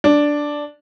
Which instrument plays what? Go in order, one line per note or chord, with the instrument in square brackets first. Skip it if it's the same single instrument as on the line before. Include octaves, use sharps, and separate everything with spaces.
[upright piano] D4